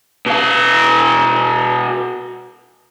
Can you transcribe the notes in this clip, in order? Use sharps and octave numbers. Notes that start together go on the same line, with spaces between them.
B2 F5